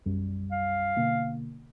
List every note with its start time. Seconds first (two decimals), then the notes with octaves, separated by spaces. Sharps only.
0.06 B1 F#2 G3
0.51 F5
0.96 B2 D3 A#3